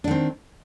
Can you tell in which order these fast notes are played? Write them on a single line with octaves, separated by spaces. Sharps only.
D4 D#3 C4